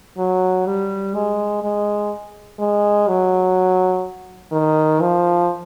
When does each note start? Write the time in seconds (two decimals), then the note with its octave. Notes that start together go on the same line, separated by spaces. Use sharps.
0.18 F#3
0.66 G3
1.14 G#3
1.62 G#3
2.59 G#3
3.08 F#3
4.52 D#3
5.01 F3